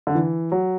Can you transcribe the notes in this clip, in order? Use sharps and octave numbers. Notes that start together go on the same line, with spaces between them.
D3
E3
F#3